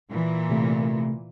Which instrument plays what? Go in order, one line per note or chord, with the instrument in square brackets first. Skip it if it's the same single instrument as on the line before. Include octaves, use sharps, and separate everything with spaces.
[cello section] A#2 E3
[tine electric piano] C3 A3